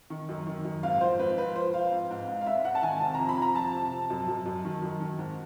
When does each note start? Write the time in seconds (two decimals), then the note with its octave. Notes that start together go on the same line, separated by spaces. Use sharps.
0.10 D#3
0.29 F#2
0.47 D#3
0.65 F#2
0.83 G#2 F5
1.01 F3 C5
1.19 G#2 B4
1.37 F3 B4
1.56 F3 C5
1.73 F3 F5
1.92 G#2
2.10 G#2
2.28 G#2
2.41 F5
2.46 G#2 E5
2.64 G#2 F#5
2.75 A5
2.82 D#3 G#5
3.00 C3 A5
3.14 F2 A#5
3.29 B5
3.37 F2 A#5
3.55 F3 A5
3.73 C3
3.91 C3
4.10 F#2
4.28 F#2
4.46 F#2
4.65 D#3
4.82 F#2
5.00 D#3
5.19 G#2